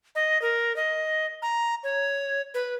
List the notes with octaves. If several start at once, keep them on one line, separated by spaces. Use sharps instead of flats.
D#5
A#4
D#5
A#5
C#5
B4